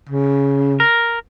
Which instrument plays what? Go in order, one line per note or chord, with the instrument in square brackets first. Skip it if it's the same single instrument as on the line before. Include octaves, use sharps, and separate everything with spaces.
[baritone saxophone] C#3
[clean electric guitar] A#4